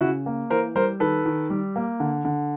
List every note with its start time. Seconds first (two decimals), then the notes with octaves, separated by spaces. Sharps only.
0.01 C#3 E4 F#4
0.26 A#3
0.50 E3 A#4 C5
0.75 G3 A#4 C5
1.00 D#3 A4 B4
1.25 D#3
1.50 G3
1.76 A#3
2.00 D3
2.25 D3